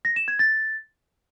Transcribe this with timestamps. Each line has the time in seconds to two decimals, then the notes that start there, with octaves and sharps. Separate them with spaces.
0.05 A#6
0.16 E7
0.28 G#6
0.39 A6